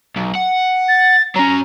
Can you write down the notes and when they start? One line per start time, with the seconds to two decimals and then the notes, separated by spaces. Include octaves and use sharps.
0.16 B1
0.35 F#5
0.89 A6
1.36 F#3 C#4 A#5